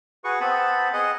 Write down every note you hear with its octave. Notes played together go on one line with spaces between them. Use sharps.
F#4 G#4 B4 C#6
B3 C4 A5 B5
G#4 D#5 F#5